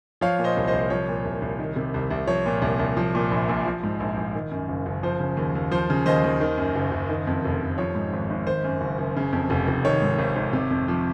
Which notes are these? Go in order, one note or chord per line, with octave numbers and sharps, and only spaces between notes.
F3 C#5 F5
A#2
C5 D#5
C2
C5 D#5
C2
F3 C#5
A#2
C2
C2
D#3
C3
C2
C2
F3 C#5
A#2
C2
C2
F3
A#2
A#1
A#1
F3
G#2
A#1
A#1
D#3
F#2
F#1
F#1
F3 C5
C#3
D#2
D#2
F3 C5
C#3
D#2 C5 D#5
D#2
D#3
F#2
F#1
F#1
D#3
F2
F1
F1
F3 C#5
G#2
G#1
G#1
D#3 C5
F#2
F#1
F#1
C#3
F2
F1
F1
D#3 C#5
G#2
G#1
G#1
C3
F2
F3